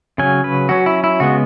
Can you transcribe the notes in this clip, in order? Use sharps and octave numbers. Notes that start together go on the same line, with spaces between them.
C#3 F#3 C#4 G#5
B4
F#3 C#4 F#4
E4
E4
C#3 G#3 B3 F#4